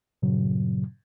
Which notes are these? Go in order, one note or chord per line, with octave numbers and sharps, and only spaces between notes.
G2 A#2 C#3 F#3